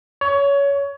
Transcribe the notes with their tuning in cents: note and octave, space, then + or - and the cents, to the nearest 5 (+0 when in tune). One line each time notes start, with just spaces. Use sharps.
C#5 +20